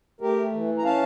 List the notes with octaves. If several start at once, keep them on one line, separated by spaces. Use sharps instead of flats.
A3 G4 A#4
E3
A#5
C#4 F5 A5